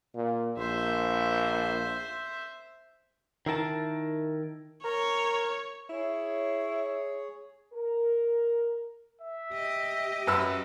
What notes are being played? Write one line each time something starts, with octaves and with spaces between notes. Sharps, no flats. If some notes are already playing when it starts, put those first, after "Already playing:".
A#2
A#1 C5 E5
D#3 E4 A#4 A5
A#4 C#5
E4 G#4 C#5
A#4
E5
G4 D#5
F#2 B4 E6